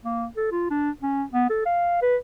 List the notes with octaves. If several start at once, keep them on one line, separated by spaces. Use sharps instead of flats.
A#3
A4
F4
D4
C#4
B3
A4
F5
B4